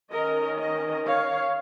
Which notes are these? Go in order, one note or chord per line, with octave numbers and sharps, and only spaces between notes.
D#3 C#4 A#4 D#5
A#4 D#5
C#5 F5